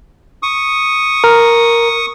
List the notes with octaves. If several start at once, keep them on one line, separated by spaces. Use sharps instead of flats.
C#6 D#6
A#4